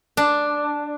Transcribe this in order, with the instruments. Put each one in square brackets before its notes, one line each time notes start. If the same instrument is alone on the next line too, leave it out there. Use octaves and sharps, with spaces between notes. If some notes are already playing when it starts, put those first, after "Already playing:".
[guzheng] D4